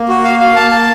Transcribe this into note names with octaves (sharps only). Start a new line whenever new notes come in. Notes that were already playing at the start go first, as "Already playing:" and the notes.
Already playing: A#3
F#4
F5
F5
A#3 A5
A5